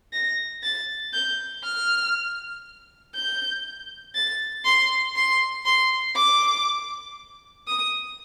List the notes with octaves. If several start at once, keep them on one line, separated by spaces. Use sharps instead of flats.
A#6
A6
G6
F6
G6
A6
C6
C6
C6
D6
D#6